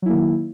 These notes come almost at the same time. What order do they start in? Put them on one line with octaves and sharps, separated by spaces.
F#3 E4 A#3 D#3